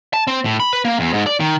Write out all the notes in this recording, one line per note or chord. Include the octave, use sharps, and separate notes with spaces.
A5
C4
A2
B5
B4
A#3
E2
G#2
D5
D#3